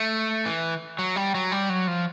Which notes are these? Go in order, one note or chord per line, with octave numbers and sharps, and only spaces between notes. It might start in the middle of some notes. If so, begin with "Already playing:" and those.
Already playing: A3
E3
F#3
G3
F#3
G3
F#3
F3